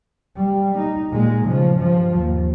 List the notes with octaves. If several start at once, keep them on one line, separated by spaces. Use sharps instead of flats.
G3
D#4
A#2 G#3
C#3 F3
G2 F3
D#2